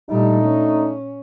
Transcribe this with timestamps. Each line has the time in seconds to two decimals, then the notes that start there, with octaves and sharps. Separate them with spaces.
0.10 A#2 G3 A3 D4 D#4
0.44 C#4